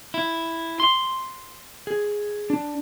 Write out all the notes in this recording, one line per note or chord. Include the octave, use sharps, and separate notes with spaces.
E4
C6
G#4
D4